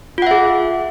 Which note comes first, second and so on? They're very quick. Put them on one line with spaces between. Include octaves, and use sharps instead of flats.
F4 F#5 E5 G#4